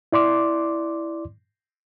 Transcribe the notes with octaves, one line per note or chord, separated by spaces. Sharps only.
E4 D5 C6 D6